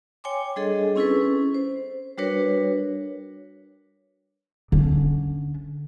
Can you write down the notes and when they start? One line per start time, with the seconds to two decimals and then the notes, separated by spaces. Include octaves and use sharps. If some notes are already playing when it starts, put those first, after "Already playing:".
0.24 C#5 G5 G#5 C6 D6
0.56 G3 D4 G#4 A4 D#5
0.96 C4 C#4 E4 G#4 A4 B4
1.16 C#4
1.54 C5
2.18 G3 D4 F#4 A#4 B4 C#5
4.72 D3 C#4